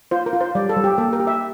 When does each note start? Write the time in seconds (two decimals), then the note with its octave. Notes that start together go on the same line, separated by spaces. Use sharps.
0.11 F4 C5
0.26 A#4
0.33 F4
0.41 C5
0.55 G3 D5
0.69 A4
0.77 G3
0.84 G4
0.98 A#3 A4
1.13 A#4
1.20 G4
1.27 E5